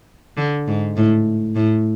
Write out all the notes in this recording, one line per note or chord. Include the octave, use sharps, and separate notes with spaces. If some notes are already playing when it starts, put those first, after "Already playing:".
D3
G#2
A2
A2